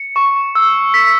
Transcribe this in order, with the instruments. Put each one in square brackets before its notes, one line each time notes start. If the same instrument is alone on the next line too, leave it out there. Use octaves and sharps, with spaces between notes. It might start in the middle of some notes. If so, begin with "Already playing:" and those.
Already playing: [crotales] C#7
C#6
E6
B6